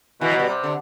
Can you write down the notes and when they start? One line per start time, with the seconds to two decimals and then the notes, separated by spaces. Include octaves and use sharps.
0.21 B2 E3
0.31 F#3
0.39 G3
0.48 C3
0.63 D3